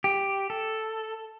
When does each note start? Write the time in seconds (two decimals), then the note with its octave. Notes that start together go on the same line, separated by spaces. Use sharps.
0.04 G4
0.50 A4